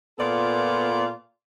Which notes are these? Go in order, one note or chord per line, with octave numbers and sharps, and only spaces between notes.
A#2 B3 F4 A4 D5